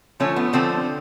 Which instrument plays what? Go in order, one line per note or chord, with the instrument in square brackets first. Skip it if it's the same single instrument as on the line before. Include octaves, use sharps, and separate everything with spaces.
[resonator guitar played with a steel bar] D3 F3 A3 C#4
B3
D3 F3 A3 C4